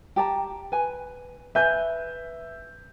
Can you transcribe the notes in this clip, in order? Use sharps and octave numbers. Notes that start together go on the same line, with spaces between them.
G4 A5 A#5
B4 G#5
B4 E5 G#5 G6